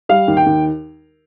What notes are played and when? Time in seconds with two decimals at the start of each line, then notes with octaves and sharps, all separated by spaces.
0.09 G3 F5
0.28 D#2
0.37 G5
0.46 D#2